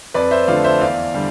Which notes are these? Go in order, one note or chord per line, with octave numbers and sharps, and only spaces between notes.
F2 B4 D5
C5 E5
D3 F3 A3 D5 F5
C5 E5
E2 D5 F5
D3 G3